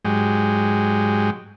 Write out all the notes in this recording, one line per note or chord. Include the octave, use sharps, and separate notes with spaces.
G#2 F#3 G#3 G4